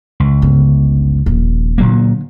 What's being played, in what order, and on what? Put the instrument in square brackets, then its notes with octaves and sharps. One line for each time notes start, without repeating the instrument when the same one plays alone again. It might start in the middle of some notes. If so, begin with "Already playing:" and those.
[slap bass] C#2
[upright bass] G1 C#3
D#1 F3
[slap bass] A#2 F#3 A#3 [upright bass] D3